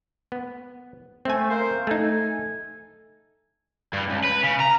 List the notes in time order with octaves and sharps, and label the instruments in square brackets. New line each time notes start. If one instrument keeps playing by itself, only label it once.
[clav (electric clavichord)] B3
[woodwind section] A3 [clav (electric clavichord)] C4 G#5
[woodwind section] A#3 A#4 C5
[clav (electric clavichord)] A3 D#4 [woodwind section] A4 G#5
[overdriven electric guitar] G2
C#2
B4
C#3
A#5